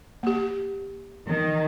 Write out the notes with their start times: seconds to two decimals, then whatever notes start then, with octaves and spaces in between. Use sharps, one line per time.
0.23 A#3 G4
1.28 D#3